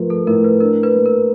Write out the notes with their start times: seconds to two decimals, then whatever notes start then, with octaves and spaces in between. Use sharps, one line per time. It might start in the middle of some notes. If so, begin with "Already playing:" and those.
Already playing: F3 A3 A#4 B4
0.10 A4
0.27 A2 A#4
0.44 B4
0.60 D4 A#4
0.83 B4
0.95 A#3
1.06 A#4